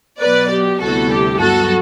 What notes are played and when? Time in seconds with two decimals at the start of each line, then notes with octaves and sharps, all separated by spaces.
0.20 B2 F#3 B3 B4 D5
0.49 G4
0.79 D2 C3 G3 B3 E4 F#4 A4
1.09 G4
1.38 G2 F#3 B3 F#4 A4